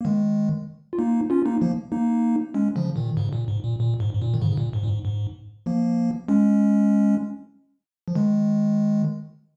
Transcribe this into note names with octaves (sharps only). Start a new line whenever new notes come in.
A#3
D#3 G#3
F4
A#3 D#4
C#4 F4
A#3 D#4
F3 A#3
A#3 D#4
G#3 C#4
C#3 F3
A#2 D#3
G#2 C#3
A#2
G#2
A#2
A#2
G#2
G#2
A#2
D#3
G#2 C#3
C#3
A#2
G#2
A#2
G#2
G#2
F3 A#3
G#3 C#4
F3
D#3 G#3